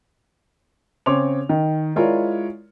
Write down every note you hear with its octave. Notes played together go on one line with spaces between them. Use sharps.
C#3 C4 C#5 C6 D6 F7
D#3
G#3 E4 F4 A#4 C#5 D5